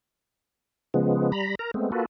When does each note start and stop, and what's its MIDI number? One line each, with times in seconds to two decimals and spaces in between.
0.94 1.32 49
0.94 1.32 53
0.94 1.32 56
0.94 1.32 59
1.32 1.55 55
1.32 1.55 82
1.32 1.55 83
1.59 1.71 70
1.59 1.71 82
1.74 1.91 56
1.74 1.91 57
1.74 1.91 59
1.74 1.91 60
1.92 2.06 58
1.92 2.06 65
1.92 2.06 66
1.92 2.06 69
1.92 2.06 71